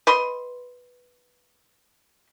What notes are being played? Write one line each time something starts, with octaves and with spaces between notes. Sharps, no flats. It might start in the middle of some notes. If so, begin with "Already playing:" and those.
B4 D#5 C6